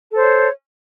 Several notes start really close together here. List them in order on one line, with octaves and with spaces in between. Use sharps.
A4 C5 C#5